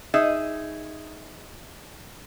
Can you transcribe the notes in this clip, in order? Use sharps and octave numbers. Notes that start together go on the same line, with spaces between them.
D#4 G#4 E5